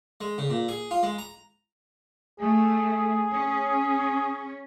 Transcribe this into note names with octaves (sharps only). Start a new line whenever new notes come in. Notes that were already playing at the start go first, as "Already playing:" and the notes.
G#3
C#3
A#2
G#4
F4
G#3
A#5
A3 G#4
C#4